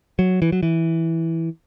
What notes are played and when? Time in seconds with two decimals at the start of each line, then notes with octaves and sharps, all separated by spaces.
0.19 F#3
0.42 E3
0.52 F#3
0.63 E3